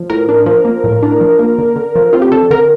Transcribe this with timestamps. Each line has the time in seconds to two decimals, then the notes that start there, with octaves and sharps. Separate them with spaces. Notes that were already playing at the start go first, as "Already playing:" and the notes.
Already playing: F3
0.10 A2 A#4
0.29 D4
0.46 F3
0.65 A#3
0.84 A2
1.03 D4
1.21 F3
1.39 A#3
1.58 D3
1.76 D3
1.96 F3
2.13 C4 F4
2.22 G4
2.32 D3 A4
2.51 D3 A#4